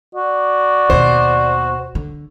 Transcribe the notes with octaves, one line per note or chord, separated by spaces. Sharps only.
F#4 D5
D#2 B2 C5
D3